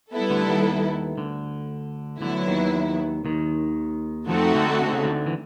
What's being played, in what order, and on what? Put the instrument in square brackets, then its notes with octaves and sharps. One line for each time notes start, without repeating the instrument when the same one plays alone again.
[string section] G3 B3 E4 A4
[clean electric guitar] D2 D3
D#2 D#3
D2 D3
[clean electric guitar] D2 D3 [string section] F#3 B3 E4
[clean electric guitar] D#2 D#3
D#2 D#3
[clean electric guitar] F2 F3 [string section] A3 C4 D#4 F#4 A4
[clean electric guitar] D2 D3
D3
C#3
D2 D3
E3